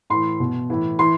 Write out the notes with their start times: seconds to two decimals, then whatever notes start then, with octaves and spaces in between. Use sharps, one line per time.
0.10 A2 E3 C6
0.40 B2
0.70 A2 E3
0.99 E3 C6